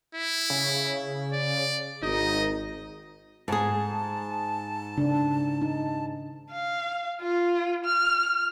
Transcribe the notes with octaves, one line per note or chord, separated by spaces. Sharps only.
E4
C#3
D5
G#1 D#4 D#5
G#2 G#4 A5
C#3 D4
D#4
F5
F4
F6